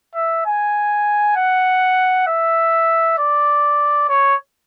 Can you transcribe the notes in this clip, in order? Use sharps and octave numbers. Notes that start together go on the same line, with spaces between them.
E5
G#5
F#5
E5
D5
C#5